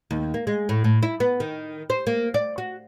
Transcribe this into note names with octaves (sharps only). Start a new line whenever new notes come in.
D#2
A#3
G#3
A2
A2
E4
B3
D#3
C5
A#3
D5
F#4